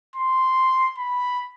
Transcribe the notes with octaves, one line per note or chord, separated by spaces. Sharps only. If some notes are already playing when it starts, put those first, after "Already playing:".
C6
B5